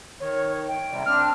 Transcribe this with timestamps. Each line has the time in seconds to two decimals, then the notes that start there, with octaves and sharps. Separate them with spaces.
0.20 D#3 C#5
0.68 G5
0.90 G#2 C3 G3
1.06 C4 D4 F6